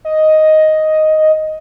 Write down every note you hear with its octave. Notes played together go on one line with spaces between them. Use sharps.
D#5